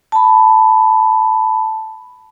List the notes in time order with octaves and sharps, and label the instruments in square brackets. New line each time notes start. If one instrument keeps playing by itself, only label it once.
[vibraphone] A5 B5